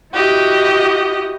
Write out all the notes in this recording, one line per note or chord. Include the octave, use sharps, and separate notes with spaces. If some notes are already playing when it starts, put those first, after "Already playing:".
E4 F#4 G4 D#5